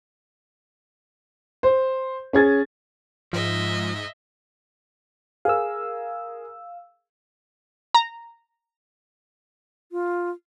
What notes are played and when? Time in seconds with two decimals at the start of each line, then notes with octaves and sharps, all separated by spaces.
1.63 C5
2.33 C#4 G#4 G#6 A6
3.33 G#2 F3 D#5 E5
5.45 G#4 A#4 F5 E6
7.95 A#5
9.92 F4